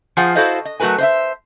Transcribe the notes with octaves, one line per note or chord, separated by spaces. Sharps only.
F3 F4 G#4 C5 F#5 G#5
E4 F#4 A4 C5 D#5 F5
D#5
F#3 A3 F#4 A#4 B4 G#5
C5 D#5 E5